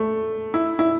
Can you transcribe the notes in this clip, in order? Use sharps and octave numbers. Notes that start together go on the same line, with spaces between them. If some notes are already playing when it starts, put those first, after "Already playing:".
Already playing: A3
E4
E4